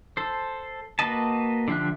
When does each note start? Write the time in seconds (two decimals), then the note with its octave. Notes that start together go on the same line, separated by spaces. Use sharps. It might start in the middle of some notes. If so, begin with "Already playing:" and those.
0.17 A4 C5
0.99 A#3 F#4 B4 D#5 A5
1.68 D3 F3 G4 E5 F#6